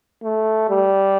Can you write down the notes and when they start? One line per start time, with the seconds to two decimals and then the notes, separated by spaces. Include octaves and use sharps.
0.23 A3
0.69 G3